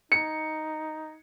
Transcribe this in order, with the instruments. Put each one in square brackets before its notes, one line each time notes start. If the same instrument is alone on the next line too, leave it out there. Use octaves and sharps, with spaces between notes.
[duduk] D#4 [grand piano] C#7